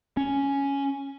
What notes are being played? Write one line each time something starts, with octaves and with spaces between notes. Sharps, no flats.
C#4